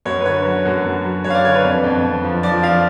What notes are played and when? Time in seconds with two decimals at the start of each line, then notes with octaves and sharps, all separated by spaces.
0.05 F#2 C#5
0.20 B4
0.26 D3 C#5
0.45 F#3
0.65 F#2
0.85 F#2
1.05 F#3
1.24 F#2 C#5
1.30 F5
1.35 D5
1.44 D3 C#5
1.54 B4
1.64 F2
1.84 F2
2.04 F2
2.24 F3
2.43 F3 D5
2.63 F3 F5